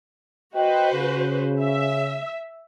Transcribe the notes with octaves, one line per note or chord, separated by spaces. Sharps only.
F#4 B4 C5 D#5 G5
C#3
E5